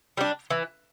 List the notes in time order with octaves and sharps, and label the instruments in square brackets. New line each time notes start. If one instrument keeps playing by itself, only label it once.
[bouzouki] G3 D4
E3